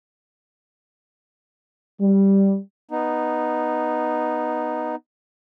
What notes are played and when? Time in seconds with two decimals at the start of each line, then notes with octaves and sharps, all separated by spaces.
2.02 G3
2.91 B3 D#4